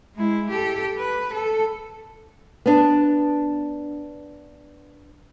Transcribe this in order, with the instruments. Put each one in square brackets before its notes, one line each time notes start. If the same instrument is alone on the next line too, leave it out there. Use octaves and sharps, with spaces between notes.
[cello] G#3 E4
G4 A4
B4
A4
[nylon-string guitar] B3 D4